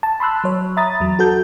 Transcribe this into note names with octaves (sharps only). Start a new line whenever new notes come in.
A5
B5 C6 E6 F#6
F#3 C#5
E5 A#5 B5 D#6 A6
E2 F#3
F#4 A4 G6